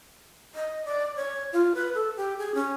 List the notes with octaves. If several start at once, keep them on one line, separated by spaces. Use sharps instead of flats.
D#5
D5
C#5
F4
B4
A4
G4
G#4
C#4